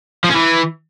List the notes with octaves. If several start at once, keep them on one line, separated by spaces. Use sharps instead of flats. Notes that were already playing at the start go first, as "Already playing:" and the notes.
F3
C#4
E3